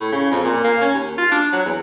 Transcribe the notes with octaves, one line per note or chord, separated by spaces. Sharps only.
A2
C#3
F2
A#2
A#3
C#4
D#2
F4
D4
F#3
E2